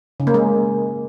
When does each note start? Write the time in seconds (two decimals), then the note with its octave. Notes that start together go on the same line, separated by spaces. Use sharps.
0.20 C#3
0.27 A#3
0.34 G#3